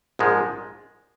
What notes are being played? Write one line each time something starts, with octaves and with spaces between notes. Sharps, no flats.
A#1 G#2 F3 G#3